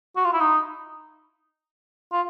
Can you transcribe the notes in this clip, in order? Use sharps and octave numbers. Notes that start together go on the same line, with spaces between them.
F#4
F4
E4
D#4
F4